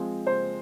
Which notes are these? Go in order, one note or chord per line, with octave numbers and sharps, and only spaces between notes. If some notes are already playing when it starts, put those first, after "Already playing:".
Already playing: F3 G#3 C4
C5